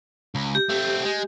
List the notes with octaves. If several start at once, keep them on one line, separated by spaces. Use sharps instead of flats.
C#2
G4
A3 C4
G#3